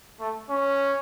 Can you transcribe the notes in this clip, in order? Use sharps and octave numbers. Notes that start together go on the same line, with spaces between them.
A3
C#4